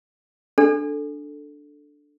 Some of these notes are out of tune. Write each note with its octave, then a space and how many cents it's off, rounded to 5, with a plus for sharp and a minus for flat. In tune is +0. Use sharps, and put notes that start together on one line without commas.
D4 +0 A4 +0